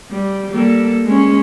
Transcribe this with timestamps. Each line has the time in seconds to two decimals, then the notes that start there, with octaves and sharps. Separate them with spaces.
0.11 G3
0.51 G3 A#3 A4
1.05 G#3 C#4